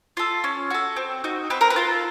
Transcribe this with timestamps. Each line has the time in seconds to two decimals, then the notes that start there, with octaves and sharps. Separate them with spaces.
0.17 F4 A4
0.44 C#4
0.70 F#4 A4
0.96 C4
1.24 D#4 F#4
1.50 C4 B4
1.61 A#4
1.70 B4
1.76 F4 A4